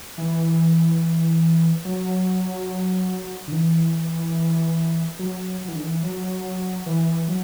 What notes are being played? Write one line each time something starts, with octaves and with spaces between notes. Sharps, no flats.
E3
F#3
D3
E3
F#3
F#3
E3
D3
E3
F#3
E3
F#3